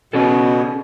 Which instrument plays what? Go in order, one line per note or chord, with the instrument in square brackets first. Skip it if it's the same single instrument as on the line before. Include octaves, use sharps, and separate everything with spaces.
[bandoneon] B2 [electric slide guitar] C#4 G#4 A4